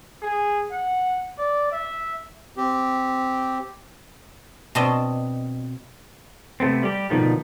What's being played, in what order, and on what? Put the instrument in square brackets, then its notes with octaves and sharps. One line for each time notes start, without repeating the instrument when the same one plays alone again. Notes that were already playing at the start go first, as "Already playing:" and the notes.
[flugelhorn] G#4
F#5
D5
E5
[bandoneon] C4 G4
[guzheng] B2 C4 D4 D#5
[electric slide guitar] C3 A3 B3 C4
G3 G4
B2 D3 D#3 F3 A3